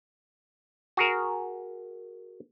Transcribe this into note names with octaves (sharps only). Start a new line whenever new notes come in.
F#4 G#4 A#4